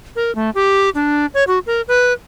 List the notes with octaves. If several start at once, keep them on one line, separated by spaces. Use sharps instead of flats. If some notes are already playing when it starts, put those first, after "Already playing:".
A#4
A3
G4
D4
C#5
F#4
A#4
B4